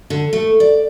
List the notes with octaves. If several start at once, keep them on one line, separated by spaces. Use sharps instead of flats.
D3
A3
D5